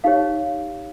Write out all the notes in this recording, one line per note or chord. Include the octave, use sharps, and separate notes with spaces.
D#4 G4 C#5 F5